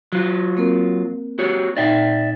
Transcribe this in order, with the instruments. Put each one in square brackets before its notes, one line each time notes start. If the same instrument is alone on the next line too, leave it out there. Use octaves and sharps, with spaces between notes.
[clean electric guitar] F#3 F4 [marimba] F#6
[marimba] A#3 C4 A#4
[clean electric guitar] F#4 G4 C#5
[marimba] A#2 D#4 [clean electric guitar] D5 E5 G5